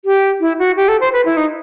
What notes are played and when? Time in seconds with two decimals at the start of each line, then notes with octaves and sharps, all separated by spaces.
0.05 G4
0.40 E4
0.59 F#4
0.77 G4
0.88 A4
1.01 C5
1.13 B4
1.25 E4
1.37 D#4